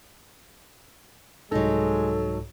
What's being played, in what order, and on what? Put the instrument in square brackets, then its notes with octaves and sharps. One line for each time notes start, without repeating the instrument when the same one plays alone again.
[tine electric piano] C2 G#2 [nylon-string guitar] F#3 D#4 [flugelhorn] G#3 [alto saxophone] A4